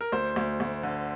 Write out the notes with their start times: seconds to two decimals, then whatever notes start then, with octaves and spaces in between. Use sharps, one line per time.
0.01 A#4
0.12 D2 C5
0.36 D2
0.60 D2
0.83 D3